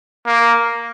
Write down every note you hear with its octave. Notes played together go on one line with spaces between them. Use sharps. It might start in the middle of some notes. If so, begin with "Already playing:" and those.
A#3